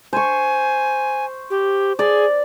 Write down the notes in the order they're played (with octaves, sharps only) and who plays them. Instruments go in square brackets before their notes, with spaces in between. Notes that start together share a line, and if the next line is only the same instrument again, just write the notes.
[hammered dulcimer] C5 C#6 [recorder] G#5
[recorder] G4
[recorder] G#4 [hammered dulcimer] D5